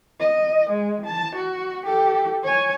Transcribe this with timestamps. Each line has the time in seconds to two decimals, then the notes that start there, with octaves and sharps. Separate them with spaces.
0.20 D#5
0.70 G#3
1.06 A5
1.36 F#4
1.86 G4 A4
2.43 C#5 G#5